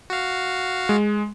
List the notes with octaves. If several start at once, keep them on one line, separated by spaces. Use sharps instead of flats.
F#4 F5
G#3